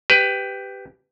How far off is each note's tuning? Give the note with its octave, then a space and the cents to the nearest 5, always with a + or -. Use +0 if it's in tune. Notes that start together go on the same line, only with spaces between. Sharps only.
G4 +0 B4 +20